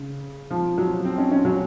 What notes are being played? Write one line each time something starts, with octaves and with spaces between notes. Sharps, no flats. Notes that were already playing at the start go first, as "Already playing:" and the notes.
Already playing: C#3
F3
F#3
C4
C#4
C#4
F#3